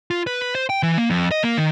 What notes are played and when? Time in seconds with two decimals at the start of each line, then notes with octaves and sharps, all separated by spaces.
0.11 F4
0.27 B4
0.42 B4
0.55 C5
0.70 G5
0.83 E3
0.97 A#3
1.10 F2
1.31 D#5
1.44 A#3
1.57 D#3